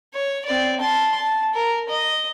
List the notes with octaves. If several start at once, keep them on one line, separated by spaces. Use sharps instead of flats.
C#5
C4 D5
A5 C6
A5
A#4
D#5